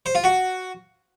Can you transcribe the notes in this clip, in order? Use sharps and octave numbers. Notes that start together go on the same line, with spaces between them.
C5
F4
F#4